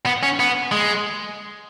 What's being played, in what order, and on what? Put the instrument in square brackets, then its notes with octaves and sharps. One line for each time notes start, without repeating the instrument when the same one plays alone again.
[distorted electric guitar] B3
C#4
B3
G#3